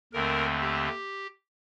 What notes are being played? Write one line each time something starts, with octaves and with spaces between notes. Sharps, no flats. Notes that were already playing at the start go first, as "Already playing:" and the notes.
D#2 D3 A3 C4 A#4
G4